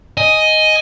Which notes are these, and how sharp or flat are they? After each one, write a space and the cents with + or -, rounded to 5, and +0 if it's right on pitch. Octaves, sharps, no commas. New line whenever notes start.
D#5 +5 G#5 +5